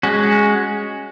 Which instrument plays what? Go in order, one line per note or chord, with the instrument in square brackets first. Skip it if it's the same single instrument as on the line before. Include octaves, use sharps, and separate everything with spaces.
[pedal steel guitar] G#3 C#4 F#4